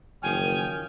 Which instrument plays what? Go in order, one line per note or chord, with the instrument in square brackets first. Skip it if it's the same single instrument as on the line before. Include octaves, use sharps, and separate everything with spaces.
[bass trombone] F#1 [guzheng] D#3 F3 C#4 [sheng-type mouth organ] G5 F6 [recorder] G#5